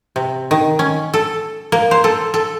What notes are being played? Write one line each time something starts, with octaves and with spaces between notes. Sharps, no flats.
C3
D#3
C#4
A4
A#3
C5
A4
A4